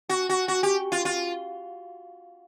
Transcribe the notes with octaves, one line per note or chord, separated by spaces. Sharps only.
F#4
F#4
F#4
G4
F4
F4